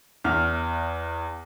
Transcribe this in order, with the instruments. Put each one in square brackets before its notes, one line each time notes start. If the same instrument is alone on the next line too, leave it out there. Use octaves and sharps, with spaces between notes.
[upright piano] E2 F6